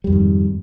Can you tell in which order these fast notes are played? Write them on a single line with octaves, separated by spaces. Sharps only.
G3 F2 D#3 G#2